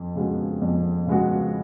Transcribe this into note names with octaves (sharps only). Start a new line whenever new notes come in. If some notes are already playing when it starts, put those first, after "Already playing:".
Already playing: F2
C#3 G#3 B3 F#4
F2
C#3 G#3 B3 F#4